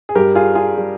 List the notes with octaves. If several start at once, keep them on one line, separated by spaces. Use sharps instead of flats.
G#4
G2 G3 G4 A#4
F4 G#4
F4 G#4
G3